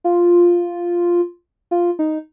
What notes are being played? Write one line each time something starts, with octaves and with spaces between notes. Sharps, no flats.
F4
F4
D#4